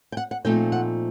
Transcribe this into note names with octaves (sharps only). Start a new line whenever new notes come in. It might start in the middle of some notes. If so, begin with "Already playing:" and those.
G5
F#5
F#5
A#2 F3 A3 C4 D#4 G5
F#5